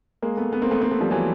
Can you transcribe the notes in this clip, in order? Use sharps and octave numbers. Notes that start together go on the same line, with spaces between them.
G#3 A#3
A3 B3
A3 B3
A#3 C4
A3 B3
A#3 C4
A3 B3
F3 G3
E3 F#3